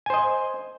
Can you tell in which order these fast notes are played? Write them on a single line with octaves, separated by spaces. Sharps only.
G#5 C5 D#5